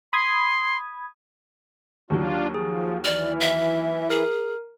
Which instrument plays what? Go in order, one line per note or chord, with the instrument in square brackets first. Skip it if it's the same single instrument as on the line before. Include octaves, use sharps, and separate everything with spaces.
[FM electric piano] B5 D#6 G#6 [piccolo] C6
[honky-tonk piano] D#2 D#3 F#3 [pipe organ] D4 F4
[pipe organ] F3 [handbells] G#4
[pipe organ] E3 [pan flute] D5 [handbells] F6
[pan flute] E5
[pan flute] G#4 [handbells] A#4